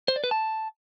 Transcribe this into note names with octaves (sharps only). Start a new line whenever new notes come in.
C5
D5
B4
A5